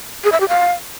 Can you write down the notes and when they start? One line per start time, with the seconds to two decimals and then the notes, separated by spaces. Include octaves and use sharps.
0.24 G#4
0.32 E5
0.40 G4
0.49 F5